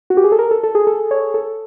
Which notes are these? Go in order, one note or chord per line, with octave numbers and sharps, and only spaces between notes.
F#4
G4
G#4
A4
A#4
A4
A4
G#4
A4
C#5
A4